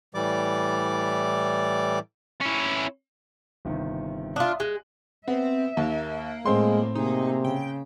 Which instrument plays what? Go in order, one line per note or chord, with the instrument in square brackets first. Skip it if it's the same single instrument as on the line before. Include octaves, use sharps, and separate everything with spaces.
[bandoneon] A2 E3 G3 D5 D6
[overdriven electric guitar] C#4 E4
[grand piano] G1 C3 D#3
[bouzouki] D4 F4 [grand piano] E5 F5 D#6
[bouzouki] G#3 [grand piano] F#6
[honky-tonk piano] B3 [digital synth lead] C4 [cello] E5
[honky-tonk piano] D#2 [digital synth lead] A#3
[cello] A2 [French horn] G#3 [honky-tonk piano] C4 C6
[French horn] C3 [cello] A#3 G#4 [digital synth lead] D#4
[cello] C#3 [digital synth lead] G5